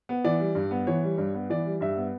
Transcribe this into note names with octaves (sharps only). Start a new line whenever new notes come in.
B3
E3 D5
G3
G2
B3
E3 C#5
G3
G2
B3
E3 D5
G3
G2 E5
B3